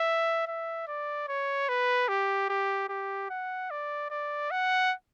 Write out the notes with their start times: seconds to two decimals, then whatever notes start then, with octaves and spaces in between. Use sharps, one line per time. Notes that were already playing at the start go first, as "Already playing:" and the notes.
Already playing: E5
0.48 E5
0.88 D5
1.28 C#5
1.69 B4
2.09 G4
2.50 G4
2.89 G4
3.30 F#5
3.71 D5
4.11 D5
4.51 F#5